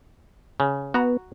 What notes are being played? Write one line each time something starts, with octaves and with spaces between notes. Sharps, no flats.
C#3
B3 F#4 A#5